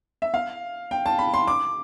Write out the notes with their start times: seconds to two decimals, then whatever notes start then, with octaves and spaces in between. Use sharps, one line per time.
0.22 E5
0.34 F5
0.91 G5
1.06 A5
1.19 B5
1.34 C6
1.47 D6